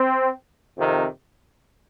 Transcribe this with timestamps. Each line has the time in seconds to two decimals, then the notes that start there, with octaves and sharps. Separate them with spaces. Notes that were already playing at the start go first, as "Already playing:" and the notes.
Already playing: C4
0.76 F2 C3 D#3